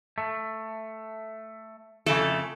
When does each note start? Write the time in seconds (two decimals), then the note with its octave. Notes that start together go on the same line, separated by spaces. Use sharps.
0.18 A3
2.06 F2 C#3 A3 A4